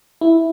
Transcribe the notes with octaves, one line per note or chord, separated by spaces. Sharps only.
E4